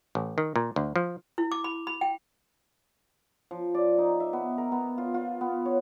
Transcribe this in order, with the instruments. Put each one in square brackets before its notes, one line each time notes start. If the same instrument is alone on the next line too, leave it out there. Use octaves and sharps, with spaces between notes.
[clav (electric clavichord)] A1
D#3
A#2
D2
F3
[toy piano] E4
D6
B5
B5
G5
[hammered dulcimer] F3
D5
D#4
E5
B3
A#4
B3
F4
F4
B3
C#5